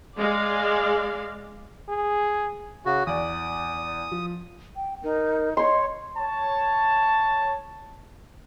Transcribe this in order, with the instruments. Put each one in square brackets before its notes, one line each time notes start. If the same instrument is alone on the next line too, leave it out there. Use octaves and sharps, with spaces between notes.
[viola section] G#3 D5 F5
[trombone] G#4
[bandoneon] C#3 F#4
[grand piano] E2 D5 [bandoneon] D#6
[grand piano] F3
[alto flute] G5
[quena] D#4 [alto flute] A#4
[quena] C#5 [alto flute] D#5 [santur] C6
[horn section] C#5 A5